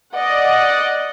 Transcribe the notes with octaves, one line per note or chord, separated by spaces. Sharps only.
D5 D#5 F#5